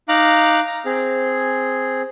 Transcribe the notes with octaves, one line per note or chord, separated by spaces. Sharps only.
D#4 F5 A#5 D6 F#6
A#5
C4 G#4